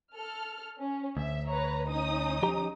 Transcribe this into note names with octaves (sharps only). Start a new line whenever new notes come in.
A4 F6
C#4
D2 E5
B4 C#5 A#5
C#4 D#4 D#6
F3 G4 A#5